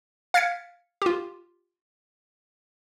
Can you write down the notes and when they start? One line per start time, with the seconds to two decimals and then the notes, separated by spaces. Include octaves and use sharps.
0.34 F5 F6 G#6 A6 B6 C#7
1.02 F4 G4